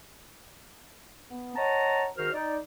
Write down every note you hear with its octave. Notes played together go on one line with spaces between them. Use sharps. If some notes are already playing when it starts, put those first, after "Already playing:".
B3
C#5 D#5 F#5 A5 A#5
G#2 D#3 F#4 A#4 C5 F6
D#4 D5